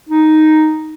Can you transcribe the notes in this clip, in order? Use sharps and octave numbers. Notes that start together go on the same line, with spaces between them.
D#4